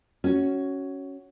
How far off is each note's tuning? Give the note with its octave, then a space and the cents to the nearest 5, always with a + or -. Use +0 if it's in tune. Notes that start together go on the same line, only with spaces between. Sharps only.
C#4 +0 F#4 +10